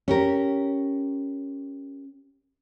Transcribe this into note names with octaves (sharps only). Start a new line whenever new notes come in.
C#4 G4 A#4